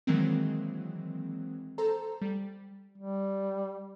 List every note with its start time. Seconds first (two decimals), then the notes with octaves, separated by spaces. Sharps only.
0.07 D#3 E3 F#3 G#3 A#3 C4
1.78 A4 C5 A#5
2.21 G3
2.98 G3